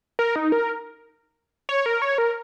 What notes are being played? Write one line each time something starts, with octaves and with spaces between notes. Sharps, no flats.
A#4
D#4
A#4
C#5
A#4
C#5
A#4